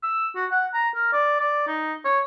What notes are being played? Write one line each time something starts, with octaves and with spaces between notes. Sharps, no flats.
E6
F#4
F#5
A#5
A#4
D5
D5
D#4
C#5